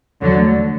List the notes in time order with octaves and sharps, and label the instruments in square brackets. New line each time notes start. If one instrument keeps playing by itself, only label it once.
[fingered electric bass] E2 [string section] D3 F#3
[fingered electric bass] A3